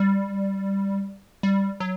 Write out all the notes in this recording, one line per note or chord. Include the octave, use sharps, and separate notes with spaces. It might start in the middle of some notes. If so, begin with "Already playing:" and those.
Already playing: G3
G3
F#3